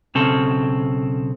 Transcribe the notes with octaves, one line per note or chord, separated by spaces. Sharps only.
B1 C#3 C4 A4